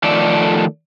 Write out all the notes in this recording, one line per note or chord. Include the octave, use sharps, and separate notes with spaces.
D#3 F3 A3 A4 D5